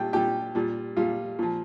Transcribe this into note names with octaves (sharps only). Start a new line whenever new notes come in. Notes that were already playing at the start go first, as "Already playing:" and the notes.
Already playing: A#2 G3 G5
A#2 G3 G4
A#2 G3
A#2 G3 F4
A#2 F3